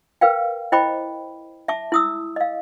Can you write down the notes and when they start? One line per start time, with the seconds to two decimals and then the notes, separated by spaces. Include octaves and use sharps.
0.21 A#4 B4 F5 G5
0.72 E4 C5 D#5 G5 B5 D6
1.68 E5 A5 D6
1.92 E4 D#6 E6
2.36 D#5 F5